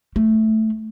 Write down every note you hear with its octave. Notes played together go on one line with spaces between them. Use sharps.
A3